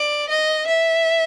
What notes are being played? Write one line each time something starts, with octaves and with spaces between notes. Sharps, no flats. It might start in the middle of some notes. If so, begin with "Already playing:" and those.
Already playing: D5
D#5
E5